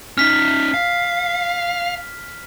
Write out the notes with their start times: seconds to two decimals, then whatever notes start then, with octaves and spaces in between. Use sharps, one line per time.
0.18 C#4 D#4 F6 B6
0.74 F5